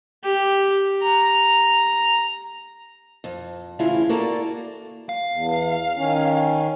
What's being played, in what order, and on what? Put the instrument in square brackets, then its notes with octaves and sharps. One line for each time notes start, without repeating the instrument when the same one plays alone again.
[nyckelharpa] G4
A#5
[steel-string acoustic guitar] F2
A2 C#3 E3 E4 F4 G#4
A#3 F#4 A4 D5
[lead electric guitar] F5
[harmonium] E2
D#3 C#4